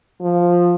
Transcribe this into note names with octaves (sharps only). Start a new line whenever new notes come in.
F3